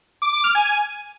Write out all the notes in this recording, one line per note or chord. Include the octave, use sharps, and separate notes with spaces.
D6
D6
F6
G#5